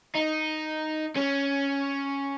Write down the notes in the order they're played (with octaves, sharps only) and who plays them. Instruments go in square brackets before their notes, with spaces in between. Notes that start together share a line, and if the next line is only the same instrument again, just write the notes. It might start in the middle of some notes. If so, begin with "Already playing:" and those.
[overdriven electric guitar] D#4
C#4